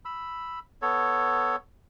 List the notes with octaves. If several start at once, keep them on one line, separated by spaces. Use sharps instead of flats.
B5 E6
B3 A4 C#5